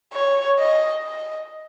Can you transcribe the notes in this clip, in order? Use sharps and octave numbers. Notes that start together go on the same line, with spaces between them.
C#5
D#5
D#5